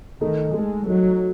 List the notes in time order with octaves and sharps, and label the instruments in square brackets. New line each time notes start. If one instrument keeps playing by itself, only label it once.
[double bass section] D#3 [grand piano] A3 D#4 A4
[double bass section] G#3 [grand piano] A3 D#4 A4
[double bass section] F#3 [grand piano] A3 D#4 A4